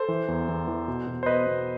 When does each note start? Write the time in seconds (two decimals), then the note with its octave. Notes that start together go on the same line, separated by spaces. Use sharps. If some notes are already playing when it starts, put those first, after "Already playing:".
Already playing: A4 C5
0.08 E3
0.28 E2
0.49 E2
0.68 E3
0.88 B2
1.07 B2
1.23 C5
1.26 B2 B4 D#5
1.46 B2